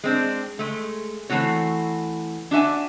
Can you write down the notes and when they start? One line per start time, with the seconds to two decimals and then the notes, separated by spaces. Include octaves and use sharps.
0.04 G#3 C4 D4
0.59 G#3 A3
1.29 E3 A3 C4 F#4 C#5
2.51 D4 F#4 E5 G#5